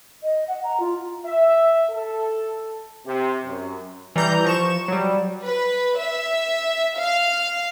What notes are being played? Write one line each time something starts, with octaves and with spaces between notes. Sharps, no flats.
D#5
F#5
A#5
F4
E5
A4
C3
F#2
E3 G3 A#5 G6
F3 C#6 E7
F#3 G3
B4
E5
F5